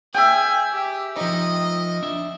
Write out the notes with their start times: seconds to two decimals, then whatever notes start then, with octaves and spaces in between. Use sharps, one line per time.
0.14 G#4 E5 G5 G#5
0.73 G4
1.17 F3 D#4 D#5
2.03 D4 E5